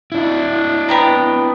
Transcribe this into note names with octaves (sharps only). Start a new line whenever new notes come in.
D4 E4
B3 G5 A#5